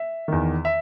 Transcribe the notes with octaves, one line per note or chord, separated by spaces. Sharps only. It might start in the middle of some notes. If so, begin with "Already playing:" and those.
Already playing: E5
E2 D#3
E5